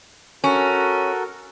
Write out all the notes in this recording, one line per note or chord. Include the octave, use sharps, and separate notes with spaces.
C#4 F#4 A4 A#4